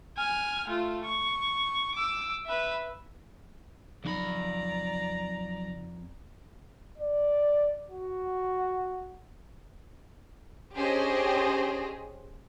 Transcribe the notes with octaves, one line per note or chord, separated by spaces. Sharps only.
G#5 F6
A3 F4
C#6
D6 E6
B4 E5
F2 C#3 F#3 D#4 F#4 D5 A#5 B5
D5
F#4
C#4 D4 G4 G#4 C5 D#5